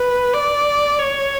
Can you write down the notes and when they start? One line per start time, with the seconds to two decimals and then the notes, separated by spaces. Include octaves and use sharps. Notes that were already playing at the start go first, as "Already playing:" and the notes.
Already playing: B4
0.33 D5
0.99 C#5